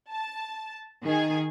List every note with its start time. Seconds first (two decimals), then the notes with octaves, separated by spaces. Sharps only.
0.11 A5
1.03 D#3 G#4 G#5